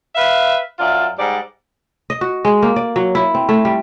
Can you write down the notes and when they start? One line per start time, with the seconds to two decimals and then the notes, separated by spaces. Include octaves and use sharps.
0.15 B4 E5 F5
0.79 F#2 F4 D5 E5
1.18 G#2 G3 D5
2.10 D#5
2.21 F#4
2.45 G#3
2.62 A#3
2.76 D5
2.96 F#3
3.15 E4
3.35 C4
3.49 A3
3.65 G3